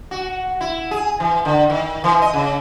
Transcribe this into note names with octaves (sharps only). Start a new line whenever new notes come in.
F#4
E4
G#4
E3
D3
D#3
E3
D#5
C#3